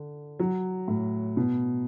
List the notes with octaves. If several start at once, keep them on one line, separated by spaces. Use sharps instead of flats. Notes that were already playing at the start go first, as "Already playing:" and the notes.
Already playing: D3
F#3
A2
B2